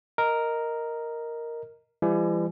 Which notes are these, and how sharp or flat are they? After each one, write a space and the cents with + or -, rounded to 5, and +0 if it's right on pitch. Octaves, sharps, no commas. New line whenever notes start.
A#4 +0 D#5 +0
E3 +40 G3 +35